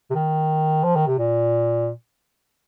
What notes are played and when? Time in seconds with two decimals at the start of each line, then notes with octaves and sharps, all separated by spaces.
0.10 C3
0.15 D#3
0.84 F3
0.96 D#3
1.07 C3
1.19 A#2